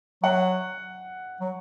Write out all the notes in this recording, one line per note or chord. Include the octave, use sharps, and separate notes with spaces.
F#3 F#5
F#3